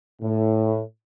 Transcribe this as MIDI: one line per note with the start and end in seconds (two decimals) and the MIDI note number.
0.22 0.81 45